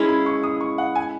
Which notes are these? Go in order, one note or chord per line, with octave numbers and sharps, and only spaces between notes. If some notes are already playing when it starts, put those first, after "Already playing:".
Already playing: G#3 C#4 E4 G#4
B5
C#6
D#6
C#6
F#5
G#5